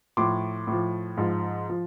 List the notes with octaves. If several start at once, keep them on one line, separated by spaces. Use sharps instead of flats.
A2 F3 C6 D6
A2 F3
G#2 F3
F3